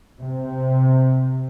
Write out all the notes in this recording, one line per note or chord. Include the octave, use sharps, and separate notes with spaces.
C3